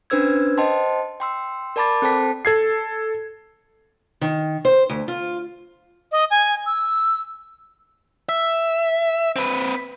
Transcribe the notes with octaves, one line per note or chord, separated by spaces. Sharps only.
C#4 D4 B4 C5 E6 G#6
C5 D#5 G5 A5 C6
G5 C6 E6
A#4 D5 A5 B5 D6 A6
C4 A4 C5 G5 A5 B6
A4 G#6 C7
D#3
C5
D2
F4
D#5
G#5
E6
E5
C4 B4